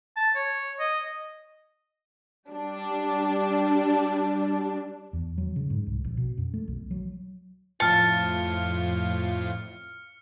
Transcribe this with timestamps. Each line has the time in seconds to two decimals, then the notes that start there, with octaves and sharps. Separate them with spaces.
0.16 A5
0.35 C#5
0.80 D#5
2.49 G3 D4
5.13 E2
5.38 F#3
5.56 C#3
5.70 G#2
5.86 C2
6.04 A#1
6.17 B2
6.37 F#2
6.54 A3
6.68 B1
6.91 F#3
7.80 F2 A2 F4 A5 F6 C#7